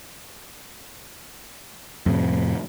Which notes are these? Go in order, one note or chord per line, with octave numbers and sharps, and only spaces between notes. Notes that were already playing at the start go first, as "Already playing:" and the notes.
F2 A2 C3